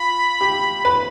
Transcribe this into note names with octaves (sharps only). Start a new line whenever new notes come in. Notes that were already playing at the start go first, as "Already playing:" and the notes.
Already playing: F4 B5
G4
B4